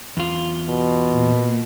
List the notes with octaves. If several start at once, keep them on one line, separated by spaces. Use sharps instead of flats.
E2 F4
B2
A#2